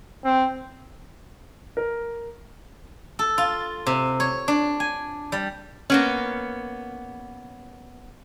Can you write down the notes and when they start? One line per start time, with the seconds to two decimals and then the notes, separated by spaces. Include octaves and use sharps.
0.25 C4
1.77 A#4
3.19 A4
3.38 F4
3.86 C3
4.20 C#5
4.48 D4
4.80 G#5
5.32 G3
5.90 A#3 B3 C#4